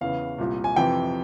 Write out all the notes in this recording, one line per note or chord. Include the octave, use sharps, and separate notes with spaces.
E2 C#3 E3 F5
C2 A#2
G#5
F2 C3 E3 G5